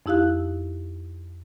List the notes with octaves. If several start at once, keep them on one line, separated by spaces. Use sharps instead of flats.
F2 D#4 E4 G4 F5 F#6